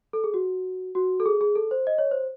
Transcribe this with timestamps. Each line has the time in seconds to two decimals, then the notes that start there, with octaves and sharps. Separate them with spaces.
0.13 A4
0.24 G#4
0.34 F#4
0.95 F#4
1.20 A4
1.26 G#4
1.41 G#4
1.56 A4
1.71 C5
1.87 D#5
1.98 C#5
2.11 C5